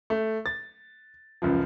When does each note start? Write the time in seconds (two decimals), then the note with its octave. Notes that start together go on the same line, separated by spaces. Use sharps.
0.10 A3
0.46 A6
1.42 C#2 F#2 F3